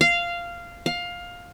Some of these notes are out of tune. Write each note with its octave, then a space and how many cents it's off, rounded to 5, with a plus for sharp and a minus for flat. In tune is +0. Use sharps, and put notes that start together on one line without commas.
F5 -10
F5 +15